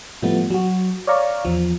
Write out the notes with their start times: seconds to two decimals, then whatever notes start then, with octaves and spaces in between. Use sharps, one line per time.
0.22 A2 F3 G3 A3 B3
0.50 F#3 F#4
1.07 C#5 D5 F5 A#5 C#6
1.45 E2 F3